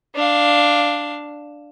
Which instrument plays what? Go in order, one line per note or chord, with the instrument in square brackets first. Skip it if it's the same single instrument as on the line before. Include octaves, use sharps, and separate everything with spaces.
[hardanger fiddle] D4 F5